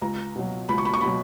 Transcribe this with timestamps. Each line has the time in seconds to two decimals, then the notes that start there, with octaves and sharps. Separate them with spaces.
0.01 C#2 A#5
0.36 B2 F#3
0.69 C#2 B5
0.78 C#6
0.85 B5
0.93 C#6
1.01 B2 F#3 B5